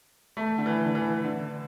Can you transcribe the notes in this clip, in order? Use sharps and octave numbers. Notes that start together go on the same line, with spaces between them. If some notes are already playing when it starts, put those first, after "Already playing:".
A3
D3
E3
D3
E3
D3